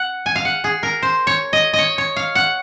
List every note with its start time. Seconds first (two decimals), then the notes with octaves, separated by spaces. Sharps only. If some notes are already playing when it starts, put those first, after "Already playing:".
Already playing: F#5
0.26 G#5
0.36 F5
0.45 F#5
0.64 G#4
0.83 A#4
1.02 C5
1.27 C#5
1.53 D#5
1.73 D#5
1.79 C#5
1.98 C#5
2.16 F5
2.35 F#5